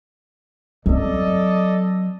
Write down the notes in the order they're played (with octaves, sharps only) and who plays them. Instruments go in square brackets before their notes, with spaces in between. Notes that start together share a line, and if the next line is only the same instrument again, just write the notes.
[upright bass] F#3 C4 [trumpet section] A4 D5 D#5